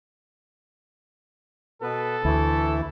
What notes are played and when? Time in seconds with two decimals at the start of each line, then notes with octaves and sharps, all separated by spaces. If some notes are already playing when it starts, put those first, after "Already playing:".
1.82 B2 B3 A4 B4
2.25 D2 E3 A3 E4